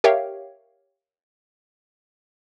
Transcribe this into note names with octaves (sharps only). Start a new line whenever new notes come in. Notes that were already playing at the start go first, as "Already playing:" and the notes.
G4 A#4 C#5 E5 F5 G5